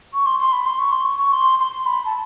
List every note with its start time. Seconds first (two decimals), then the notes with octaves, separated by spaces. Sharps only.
0.14 C#6
0.26 C6
0.39 C6
0.52 B5
0.66 C6
0.79 C#6
0.92 C6
1.05 C#6
1.18 C#6
1.33 C6
1.59 C6
1.86 B5
2.05 A5